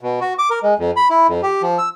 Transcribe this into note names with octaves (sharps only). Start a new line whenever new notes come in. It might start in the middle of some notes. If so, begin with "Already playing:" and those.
B2
F#4
D6
A#4
G#3
F2
B5
E4
F2
G4
F3
E6